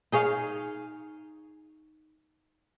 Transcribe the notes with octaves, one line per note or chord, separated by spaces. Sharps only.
D#4 G#4 C#5 F5